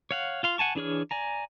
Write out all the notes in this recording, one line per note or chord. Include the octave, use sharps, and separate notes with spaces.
C#5 F5 F#5
F4 F5 C6
F#5 G#5 A5 C#6
E3 D4 G#4 C#5 F6
D5 G#5 A#5